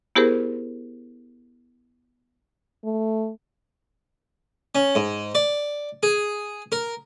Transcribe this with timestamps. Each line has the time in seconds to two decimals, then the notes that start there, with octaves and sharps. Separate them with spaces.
0.15 B3 E4 G4 G#4 A#4 C5
2.85 A3
4.75 C#4
4.95 G#2
5.35 D5
6.03 G#4
6.72 A#4